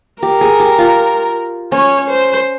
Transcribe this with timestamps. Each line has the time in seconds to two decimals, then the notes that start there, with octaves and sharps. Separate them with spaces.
0.23 G4 A#4
0.41 G#4
0.60 G4
0.78 F4
1.72 C#4 C#5
2.10 C5